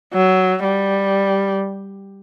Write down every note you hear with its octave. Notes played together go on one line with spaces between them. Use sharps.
F#3
G3